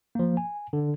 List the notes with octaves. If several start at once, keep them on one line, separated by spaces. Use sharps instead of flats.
F3 A#3
G#5
D3